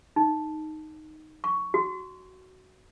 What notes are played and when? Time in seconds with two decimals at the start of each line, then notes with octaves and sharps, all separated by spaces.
0.16 D#4
1.44 C#6
1.74 F#4